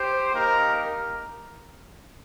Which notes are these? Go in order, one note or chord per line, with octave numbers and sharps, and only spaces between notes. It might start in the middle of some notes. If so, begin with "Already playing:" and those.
Already playing: G4 C5
A#3 D#4 G4 A#4
A#4